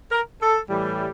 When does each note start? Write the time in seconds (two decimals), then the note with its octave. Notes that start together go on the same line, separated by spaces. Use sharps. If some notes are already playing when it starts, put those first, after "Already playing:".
0.12 A#4
0.41 A4
0.69 A2 E3 G3